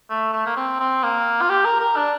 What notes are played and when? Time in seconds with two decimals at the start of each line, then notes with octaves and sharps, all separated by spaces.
0.10 A3
0.33 A3
0.46 A#3
0.57 C4
0.80 C4
1.03 A#3
1.41 F4
1.50 G4
1.65 A#4
1.80 A#4
1.96 D4